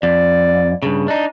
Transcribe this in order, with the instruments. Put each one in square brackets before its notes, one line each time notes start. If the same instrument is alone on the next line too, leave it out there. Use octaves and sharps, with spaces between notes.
[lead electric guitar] F2 [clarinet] D5
[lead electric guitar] G2 C#3
[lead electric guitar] D4 D#4 [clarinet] D#5